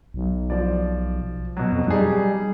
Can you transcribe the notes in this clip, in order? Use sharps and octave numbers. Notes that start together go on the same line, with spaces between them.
B1
F3 D5
B2 F#3
F2
G3 D#4 G#4